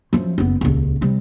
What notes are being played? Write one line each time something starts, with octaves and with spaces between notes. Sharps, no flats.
F#2 F3
F#1 B3
D#1 C#2
C3 G3